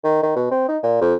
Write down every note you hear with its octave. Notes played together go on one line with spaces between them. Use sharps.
D#3
D#3
B2
C4
D#4
A#2
F2